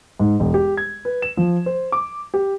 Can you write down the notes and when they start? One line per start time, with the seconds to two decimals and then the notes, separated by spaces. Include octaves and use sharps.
0.20 G#2
0.40 E1
0.54 G4
0.77 G#6
1.05 B4
1.22 E7
1.37 F3
1.66 C5
1.92 D6
2.34 G4